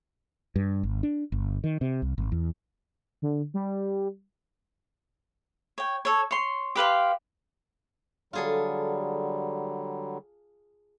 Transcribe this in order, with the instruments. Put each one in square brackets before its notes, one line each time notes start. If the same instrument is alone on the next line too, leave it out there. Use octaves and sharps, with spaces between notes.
[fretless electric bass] G2
G#1
D4
G1
D#3
C3
C2
G#1
E2
[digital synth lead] D3
G3
[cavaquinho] C#5 G5
A4 C#5
C#5 C6
G4 B4 F5 C6
[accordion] D3 F#3 G3 [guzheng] F4 G#4 A4